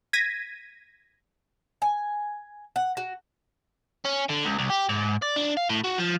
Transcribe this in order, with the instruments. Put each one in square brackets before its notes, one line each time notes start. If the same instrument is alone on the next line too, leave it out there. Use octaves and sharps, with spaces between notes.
[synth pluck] G#6 A#6 B6 D#7
[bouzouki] G#5
F#5
F#4
[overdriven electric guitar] C#4
D3
C#2
C2
G4
G#2
D5
D4
F5
A2
F#4
F3